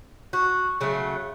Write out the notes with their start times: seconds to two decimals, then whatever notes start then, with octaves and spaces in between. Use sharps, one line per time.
0.33 F#4
0.81 C#3 F#3 A3